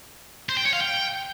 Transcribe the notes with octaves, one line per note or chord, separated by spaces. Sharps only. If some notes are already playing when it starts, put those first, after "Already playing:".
C5
G5
C#5
F5
G5